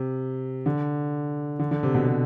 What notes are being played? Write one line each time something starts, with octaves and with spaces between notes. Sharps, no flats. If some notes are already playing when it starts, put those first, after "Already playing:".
Already playing: C3
D3
D3
D3
C3
B2
C3